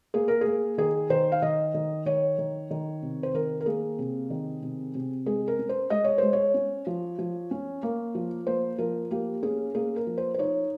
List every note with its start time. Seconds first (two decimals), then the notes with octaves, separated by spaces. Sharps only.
0.14 A#3 G#4
0.28 A#4
0.41 G#4
0.46 A#3
0.78 D#3 G#4
1.10 D#3 C5
1.32 F5
1.42 D#3 D#5
1.74 D#3
2.06 D#3 C#5
2.38 D#3
2.71 D#3
3.02 C3
3.23 C5
3.34 D#3 A#4
3.60 A#4
3.66 A#3 G#4
3.99 C3
4.30 D#3
4.62 C3
4.95 C3
5.26 G#3 G#4
5.48 A#4
5.59 C#4
5.69 C5
5.90 G#3 D#5
6.04 C#5
6.18 G#3 C5
6.33 C#5
6.54 C#4
6.87 F3
7.19 F3
7.51 C#4
7.83 A#3
8.15 F3
8.47 A#3 C5
8.78 F3 A#4
9.11 A#3 G4
9.43 C#4 G#4
9.75 A#3 G#4
9.96 A#4
10.07 F3
10.17 C5
10.34 C5
10.39 D#4 C#5